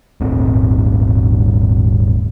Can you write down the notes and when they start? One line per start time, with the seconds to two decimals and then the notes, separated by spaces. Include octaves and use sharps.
0.21 D#1 G#1 C4